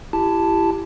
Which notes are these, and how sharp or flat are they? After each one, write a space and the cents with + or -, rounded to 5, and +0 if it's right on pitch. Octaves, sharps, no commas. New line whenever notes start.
E4 +30 G4 +0 A5 +0